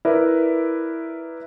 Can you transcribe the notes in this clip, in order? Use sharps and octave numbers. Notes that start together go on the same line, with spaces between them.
E4 A#4 B4 D5 E5